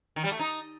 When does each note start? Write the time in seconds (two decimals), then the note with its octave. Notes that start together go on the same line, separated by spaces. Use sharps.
0.16 D#3
0.24 G3
0.32 A3
0.39 D#4